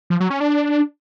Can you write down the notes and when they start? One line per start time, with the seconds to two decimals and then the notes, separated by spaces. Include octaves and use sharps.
0.10 F3
0.20 F#3
0.30 C#4
0.40 D4